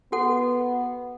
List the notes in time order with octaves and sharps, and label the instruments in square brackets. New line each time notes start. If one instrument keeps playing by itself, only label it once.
[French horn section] B3 [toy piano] F#4 A4 F#5